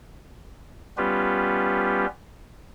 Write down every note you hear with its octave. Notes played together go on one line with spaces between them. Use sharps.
G3 B3 C#4 F4 G4 B4